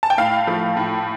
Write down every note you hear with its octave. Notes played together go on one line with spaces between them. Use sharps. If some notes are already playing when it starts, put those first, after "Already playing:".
A5
G5
A2 F5
F3 A3
A2